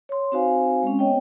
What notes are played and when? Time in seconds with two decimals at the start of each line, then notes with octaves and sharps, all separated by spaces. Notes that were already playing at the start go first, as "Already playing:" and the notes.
0.09 C#5 C6
0.32 C4 D#4 F#4 C5 F5 G#5
0.83 G#3 C4 C#4
0.99 B3 C#5 D#5 G5